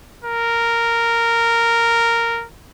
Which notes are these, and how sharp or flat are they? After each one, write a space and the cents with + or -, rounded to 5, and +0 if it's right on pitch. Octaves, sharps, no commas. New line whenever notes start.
A#4 -10